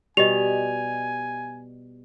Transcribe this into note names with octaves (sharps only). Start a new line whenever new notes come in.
B2 G3 G4 D#5 G#5 F7